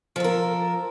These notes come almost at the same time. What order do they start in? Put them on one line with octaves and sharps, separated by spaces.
F3 A4 A#4